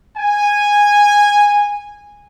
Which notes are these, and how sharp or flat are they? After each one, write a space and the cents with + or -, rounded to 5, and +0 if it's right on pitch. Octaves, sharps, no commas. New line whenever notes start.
G#5 -10